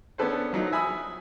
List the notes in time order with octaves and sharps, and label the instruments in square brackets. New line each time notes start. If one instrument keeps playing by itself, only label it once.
[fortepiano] B3 C#4 D4 A4 B4 C5
F3 F#3 D#4
E5 G#5 B5 D#6 E6